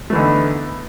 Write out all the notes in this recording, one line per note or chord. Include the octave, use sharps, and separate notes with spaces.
D3 E3 A3 B3 D#4